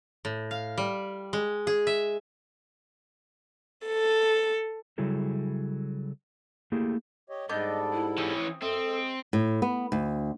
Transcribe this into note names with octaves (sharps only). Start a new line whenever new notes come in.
A2
F5
G3
G#3
G#4
E5
A4
C#3 F#3 G3 E4 G#4 A4
A3 A#3 E4 G4 G#4
G4 C#5 D#5
G#2 G3 B3 D4 A4 D#5 G6
E4
E3 C4 C#4 D#6 E6
F#2 C4 A4 D#5 E5
G#3
A2
B3
D2